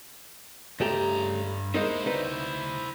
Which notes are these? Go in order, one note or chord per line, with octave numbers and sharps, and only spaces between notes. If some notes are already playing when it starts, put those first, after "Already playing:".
C#2 G2 A3 G4 A#5
G#3 A#3 D#4 E4 C5
D2 D#4 B4